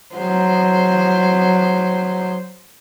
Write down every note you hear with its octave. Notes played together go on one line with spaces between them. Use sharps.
F#3 C5